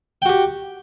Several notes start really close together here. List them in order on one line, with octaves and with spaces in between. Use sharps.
G5 F#4 G4